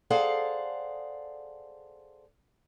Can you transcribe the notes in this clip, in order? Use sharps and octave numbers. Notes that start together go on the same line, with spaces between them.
G#4 A4 C5 D5 F5 F#5